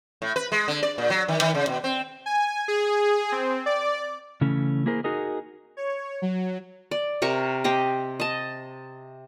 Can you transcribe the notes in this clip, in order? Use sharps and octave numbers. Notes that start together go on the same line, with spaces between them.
A2
B4
G#3
D3
D5
A#2
F#3
D#3
D#3
C#3
B2
C4
G#5
G#4
C4
D5
C#3 E3 A3 C#4
A#3 E4 G#4 A#4 C5
D#4 F#4 G#4 A#4 D#5
C#5
F#3
D5
C3 A#4 C#6
C4 G4 D#5
D#5 A5